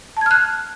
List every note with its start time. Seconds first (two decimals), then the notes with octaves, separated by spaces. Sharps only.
0.17 A5
0.21 G#6
0.26 F6
0.31 F#6